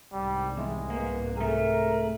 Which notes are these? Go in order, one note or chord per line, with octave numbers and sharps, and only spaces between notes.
C2 G#2 G3
E2 G#3
A#3 B3
A3 G#4 A#4